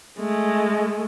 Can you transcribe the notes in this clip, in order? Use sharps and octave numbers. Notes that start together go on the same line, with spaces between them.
G#3 A3